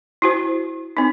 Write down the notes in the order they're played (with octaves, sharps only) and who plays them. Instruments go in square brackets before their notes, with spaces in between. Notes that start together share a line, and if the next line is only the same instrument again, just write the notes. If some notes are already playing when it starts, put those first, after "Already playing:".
[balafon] E4 F#4 C5
C4 D#4